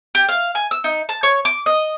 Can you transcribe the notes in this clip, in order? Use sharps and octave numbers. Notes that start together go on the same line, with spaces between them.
G4
F5
G#5
E6
D#4
A5
C#5
D6
D#5